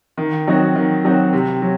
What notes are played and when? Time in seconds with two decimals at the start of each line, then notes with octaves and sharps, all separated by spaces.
0.17 D#3
0.47 F#3 C4 D#4 F#4
0.75 D#3
1.04 F#3 C4 D#4 F#4
1.33 C3
1.62 F#3